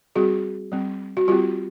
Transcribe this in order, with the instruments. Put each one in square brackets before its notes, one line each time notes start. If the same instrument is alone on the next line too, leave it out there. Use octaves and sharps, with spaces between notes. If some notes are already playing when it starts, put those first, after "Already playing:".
[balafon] G3 C4 F#4 G#4
G3 C4
F#4
G3 C4 F4 G4